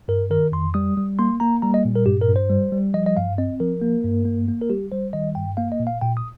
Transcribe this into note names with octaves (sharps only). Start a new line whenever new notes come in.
G2 A#4
D#3 A#4
F2 C6
G3 D#6
G3
A#3 C6
A#3 A#5
G3 A#5
D#5
A#2
A#4
G2 G4
A#4
G2
C5
G3
G3
F3 D#5
D#5
G2 F5
C4 D#5
F3 A#4
A#3
G2
A#3
A#3
A#4
G3 G4
G3 C5
D#3 D#5
G2 G5
A#3 F5
D#5
A#2
F5
A#2 G5
D#6